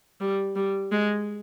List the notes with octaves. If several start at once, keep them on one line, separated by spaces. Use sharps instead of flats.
G3
G3
G#3